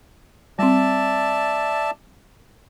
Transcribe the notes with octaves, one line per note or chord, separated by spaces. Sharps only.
G3 C4 D5 E5 A5